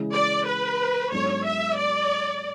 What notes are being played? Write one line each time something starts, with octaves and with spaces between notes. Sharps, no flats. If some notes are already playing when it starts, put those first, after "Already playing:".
Already playing: C#3 E3 G#3
D5
B4
G#2 F#3 B3 D4 A4 C#5
E5
D5